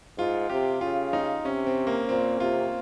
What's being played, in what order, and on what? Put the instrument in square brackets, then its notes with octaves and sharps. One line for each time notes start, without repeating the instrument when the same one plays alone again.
[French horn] G#2 [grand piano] F4
[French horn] C3 [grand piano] G4
[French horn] C#3 [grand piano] F4
[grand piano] D#4
[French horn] C3 [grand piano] C#4
[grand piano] C4
A#3
[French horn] A#2 [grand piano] C4
[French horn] C3 [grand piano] F4